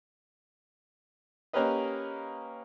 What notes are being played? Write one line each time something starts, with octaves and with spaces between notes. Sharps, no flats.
A#3 C#4 G4 A#4 B4 D#5